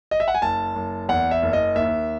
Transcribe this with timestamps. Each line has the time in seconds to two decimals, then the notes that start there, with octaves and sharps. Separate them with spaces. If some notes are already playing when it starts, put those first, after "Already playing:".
0.11 D#5
0.20 E5
0.28 F#5
0.35 G#5
0.42 F#1 A5
0.75 F#1
1.09 E2 F#5
1.31 E5
1.42 F#1
1.53 D#5
1.75 D#2 E5